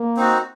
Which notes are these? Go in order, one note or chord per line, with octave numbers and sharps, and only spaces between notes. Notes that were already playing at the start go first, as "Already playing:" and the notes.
Already playing: A#3
C4 D#4 F#4